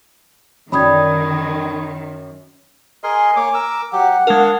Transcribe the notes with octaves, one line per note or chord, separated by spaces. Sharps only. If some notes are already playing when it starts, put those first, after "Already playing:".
F#2 D3 D#3 G3 D#4 B5 D#6 G#6
G#4 A#4 D#5 G#5 C6
A#3 C#5 D6
A#4 E6
F#3 G4 F#5
G#3 D4 A#4 F5